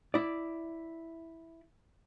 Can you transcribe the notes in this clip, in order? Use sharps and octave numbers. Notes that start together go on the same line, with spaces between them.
E4 D5